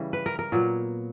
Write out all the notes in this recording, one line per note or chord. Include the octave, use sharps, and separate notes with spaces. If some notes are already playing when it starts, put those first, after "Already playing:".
Already playing: C#3 E3 G3
B4
A#4
A#4
A#2 F#3 B3